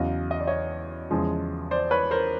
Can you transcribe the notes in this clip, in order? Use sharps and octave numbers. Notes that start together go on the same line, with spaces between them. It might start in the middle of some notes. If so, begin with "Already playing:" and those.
Already playing: E2 C#3 F#3 D#5 F5
D#5
D5
C#5 D#5
E2 C#3 F3 G#3
C5 D5
B4 C#5
A#4 C5